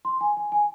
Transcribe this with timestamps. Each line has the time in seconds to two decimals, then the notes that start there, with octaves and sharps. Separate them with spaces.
0.05 C6
0.21 G#5
0.37 G#5
0.52 G#5